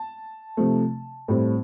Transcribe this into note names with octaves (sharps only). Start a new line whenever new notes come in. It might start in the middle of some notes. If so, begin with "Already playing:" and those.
Already playing: A5
C3 F3 A3
A2 G3 C4